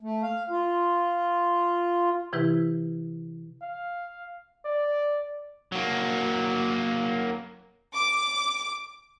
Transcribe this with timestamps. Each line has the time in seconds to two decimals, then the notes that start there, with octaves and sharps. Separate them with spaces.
0.01 A3
0.23 F5
0.50 F4
2.33 C3 E3 E4 G4 B4
3.62 F5
4.66 D5
5.72 F#3 A#3
7.95 D6